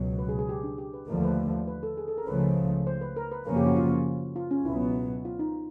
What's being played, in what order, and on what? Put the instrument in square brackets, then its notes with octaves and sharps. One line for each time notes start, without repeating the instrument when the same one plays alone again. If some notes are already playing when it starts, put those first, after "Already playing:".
Already playing: [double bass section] C#2 B2 F#3
[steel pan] B4
G#4
G#4
G4
D4
G4
B4
[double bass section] D#2 D3 F3 A3 [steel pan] A#4
[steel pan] B4
B4
A4
G#4
A4
A#4
[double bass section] C#2 C#3 F3 A3 [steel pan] B4
[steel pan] C5
B4
A#4
B4
[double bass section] F#2 C#3 F3 A#3 C#4 [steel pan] A#4
[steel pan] G4
F#4
F4
F4
C#4
[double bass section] C#2 B2 F#3 B3 [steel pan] E4
[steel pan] F4
D#4